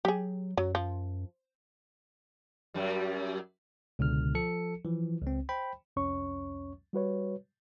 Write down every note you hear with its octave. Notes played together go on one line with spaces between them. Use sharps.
F#3 G4 G#4
F#2 F#3
F3
F#2 G3
C#2 B2 D3 F6
F3 A4 C#7
E3 F3
C#2 C4
C5 G5 B5
C2 F2 C#4 C#5 C#6
G3 F#4 B4 C#5